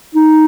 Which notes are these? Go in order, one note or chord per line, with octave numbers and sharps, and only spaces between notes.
D#4